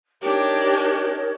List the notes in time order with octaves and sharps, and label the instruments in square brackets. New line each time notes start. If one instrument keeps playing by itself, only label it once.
[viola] D4 G4 [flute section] D#4 A#4 C#5